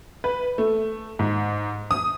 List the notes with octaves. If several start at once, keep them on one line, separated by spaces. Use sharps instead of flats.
B4
A3
G#2
D#6